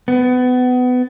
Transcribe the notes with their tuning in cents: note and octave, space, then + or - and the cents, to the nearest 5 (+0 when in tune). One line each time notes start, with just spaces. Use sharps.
B3 +25